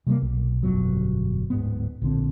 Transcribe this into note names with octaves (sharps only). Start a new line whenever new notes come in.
C3 G3 A3 A#3
B1
G1 F2 B2 F#3
D1 G#2 B3
A#1 D3 C4